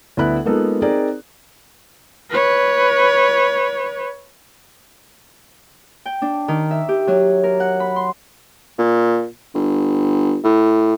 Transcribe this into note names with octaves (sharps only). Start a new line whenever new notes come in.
D2 B3 E4 B5 F#6
G#3 A#3 B3 D#4 F4 A4
C4 D#4 G#4 A#4 D5
B4 C#5
G5
D4
D#3
E5
G4
F#3
A#4
F#5
B5
C6
A#2
G1
A2